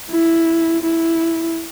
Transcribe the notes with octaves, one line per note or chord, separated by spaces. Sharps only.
E4
E4